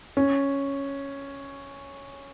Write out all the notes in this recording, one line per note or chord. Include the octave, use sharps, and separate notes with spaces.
C#4